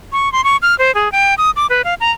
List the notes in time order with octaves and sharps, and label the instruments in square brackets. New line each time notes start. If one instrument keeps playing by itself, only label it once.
[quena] C#6
C6
C#6
F6
C5
G#4
G5
D#6
D6
B4
F5
A#5